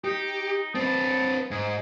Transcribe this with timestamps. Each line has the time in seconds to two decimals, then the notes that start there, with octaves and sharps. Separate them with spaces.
0.04 D#4 G4
0.75 C4 B4 A5
1.51 G#2 G#4